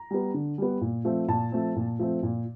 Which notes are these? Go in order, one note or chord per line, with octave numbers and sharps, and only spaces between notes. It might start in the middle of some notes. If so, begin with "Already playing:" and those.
Already playing: A#5
G3 B3
D3
G3 B3
A#2
F3 A3 C4
A#2 A5
F3 A3 C4
A#2
F3 A3 C4
A#2